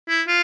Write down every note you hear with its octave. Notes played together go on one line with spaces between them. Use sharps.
E4
F4